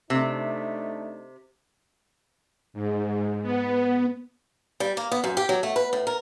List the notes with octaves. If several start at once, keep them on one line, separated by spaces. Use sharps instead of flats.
C3 A3 D4 D#4
G#2
B3
G3
A#3
B3
F#2
G4
F#3
A3
B4
A2
A#4